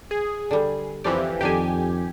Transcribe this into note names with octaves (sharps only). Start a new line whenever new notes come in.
G#4
D3 G3
F2 E3 F3 G4 D5
F2 D#3 D4 G4 A4 G#5